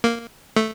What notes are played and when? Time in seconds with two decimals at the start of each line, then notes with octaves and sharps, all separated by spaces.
0.04 A#3
0.56 A3